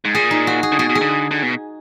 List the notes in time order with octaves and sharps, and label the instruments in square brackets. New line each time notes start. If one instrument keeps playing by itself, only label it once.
[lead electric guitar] G#2
[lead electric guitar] A#2 [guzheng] G#4
[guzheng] D#4
F#4
G#4
[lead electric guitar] D3
[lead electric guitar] B2 [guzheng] G#4
[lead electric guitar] B2
[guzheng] G#4
[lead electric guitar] D3
D3
B2